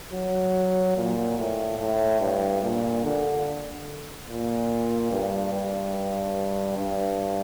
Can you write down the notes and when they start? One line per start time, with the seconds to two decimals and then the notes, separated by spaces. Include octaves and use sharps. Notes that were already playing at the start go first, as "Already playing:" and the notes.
0.13 F#3
0.96 A#2
1.38 A2
1.79 A2
2.20 G2
2.63 A#2
3.04 D3
4.28 A#2
5.11 G2
5.53 G2
6.78 G2